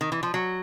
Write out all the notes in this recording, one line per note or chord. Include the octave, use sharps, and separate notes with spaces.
D#3
E3
F3
F#3